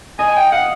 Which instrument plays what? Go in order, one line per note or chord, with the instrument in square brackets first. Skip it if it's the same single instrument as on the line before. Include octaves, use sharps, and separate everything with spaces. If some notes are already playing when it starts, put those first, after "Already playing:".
[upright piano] D#5 [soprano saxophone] G#5
[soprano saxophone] G#5
G5
[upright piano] F5 [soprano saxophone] F#5